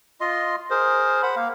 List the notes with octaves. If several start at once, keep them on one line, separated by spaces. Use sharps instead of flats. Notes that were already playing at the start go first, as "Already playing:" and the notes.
F4 D#5 C6
G#4 A#4 C5
C5 F#5 B5
A#3 F5